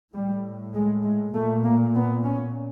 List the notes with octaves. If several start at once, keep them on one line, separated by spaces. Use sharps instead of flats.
A2 G3
G#3
G#3
A#2 A3
A#3
B3
C#4